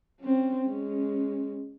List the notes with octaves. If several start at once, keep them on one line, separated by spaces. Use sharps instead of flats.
C4 C#4
G#3 C#4